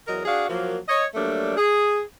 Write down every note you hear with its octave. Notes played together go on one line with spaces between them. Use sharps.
E2 F#3 A#4 D#5
D4 F#4 G#4 F5
F3 F#3 A#3
C#5 D#5
F#3 G3 A3 A#3 D4
G#4